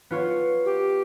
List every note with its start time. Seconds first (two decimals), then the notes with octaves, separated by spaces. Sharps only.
0.11 B3 F4 C#5
0.65 G4